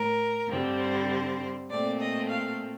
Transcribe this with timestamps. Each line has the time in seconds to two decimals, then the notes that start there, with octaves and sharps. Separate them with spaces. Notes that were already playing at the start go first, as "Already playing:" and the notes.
Already playing: A2 A#4
0.49 G2 D3 G3 C4
0.79 C5
1.70 A#2 A3 C4 D5
2.00 D#5
2.29 F5